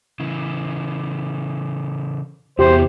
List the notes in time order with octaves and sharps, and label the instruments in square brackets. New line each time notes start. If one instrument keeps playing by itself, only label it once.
[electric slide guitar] C#3 E3
[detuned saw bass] E2 [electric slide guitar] C3 F#4 E5 [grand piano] G4 [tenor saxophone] C5